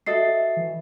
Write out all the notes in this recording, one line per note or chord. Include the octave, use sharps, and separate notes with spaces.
F#4 A4 D#5 E5 A6 C7
E3